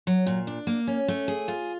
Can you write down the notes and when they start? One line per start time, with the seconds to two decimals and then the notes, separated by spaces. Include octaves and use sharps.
0.07 F#3
0.26 A#2
0.47 D4
0.67 A#3
0.87 C#4
1.08 A3
1.28 G#4
1.48 F4